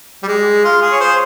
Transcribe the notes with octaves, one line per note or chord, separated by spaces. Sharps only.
G3
G#3
F4
G#4
C#5
C5